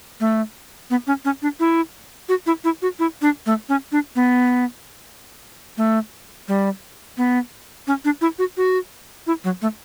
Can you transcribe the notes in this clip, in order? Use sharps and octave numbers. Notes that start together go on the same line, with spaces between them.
A3
B3
C#4
C#4
D4
E4
F#4
E4
E4
F#4
E4
D4
A3
C#4
D4
B3
A3
G3
B3
C#4
D4
E4
F#4
F#4
E4
F#3
A3